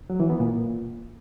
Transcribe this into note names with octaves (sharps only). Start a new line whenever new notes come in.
F#3
E3
B3
A#2